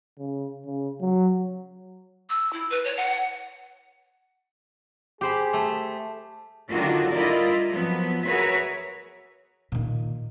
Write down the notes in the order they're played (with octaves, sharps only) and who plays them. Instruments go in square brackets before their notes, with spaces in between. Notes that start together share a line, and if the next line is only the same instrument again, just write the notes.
[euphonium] C#3
C#3
F#3
[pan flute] E6
E4
B4
C#5
F#5
[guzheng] G4 C5 B5 [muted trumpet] G#4
[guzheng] A3
[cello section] D3 D#3 F#3 D4 F4 F#4
G3 E4 F4 A#4 D5 D#5
F3 F#3 B3
F#4 G#4 A#4 B4 C#5 E5
[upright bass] A#2 D#3